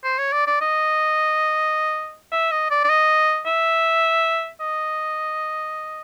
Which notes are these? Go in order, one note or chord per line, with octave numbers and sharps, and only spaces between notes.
C5
C#5
D5
D5
D#5
E5
D#5
D5
D5
D#5
E5
D#5